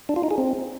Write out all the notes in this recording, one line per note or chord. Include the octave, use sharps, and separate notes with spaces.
D4
F4
D#4
G#4
C4